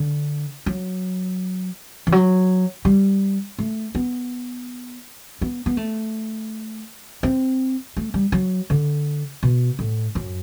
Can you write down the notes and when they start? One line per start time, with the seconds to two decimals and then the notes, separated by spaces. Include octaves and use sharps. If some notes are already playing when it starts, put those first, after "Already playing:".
Already playing: D3
0.66 F#3
2.07 E3
2.12 F#3
2.85 G3
3.59 A3
3.95 B3
5.41 B3
5.66 B3
5.77 A3
7.23 C4
7.97 A3
8.14 G3
8.32 F#3
8.70 D3
9.43 B2
9.79 A2
10.15 F#2